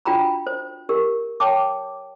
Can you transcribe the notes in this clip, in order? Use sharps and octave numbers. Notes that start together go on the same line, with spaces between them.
D4 F4 F#4 G5 A#5 B5
C5
G4 A#4
C#5 G5 A5 D6